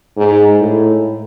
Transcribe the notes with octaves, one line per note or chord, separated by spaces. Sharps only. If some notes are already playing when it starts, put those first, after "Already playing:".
G#2
A2